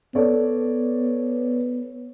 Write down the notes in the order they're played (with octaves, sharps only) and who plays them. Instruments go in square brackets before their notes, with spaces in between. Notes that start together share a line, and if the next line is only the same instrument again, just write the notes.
[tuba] B3 [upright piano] A4 C#5 D5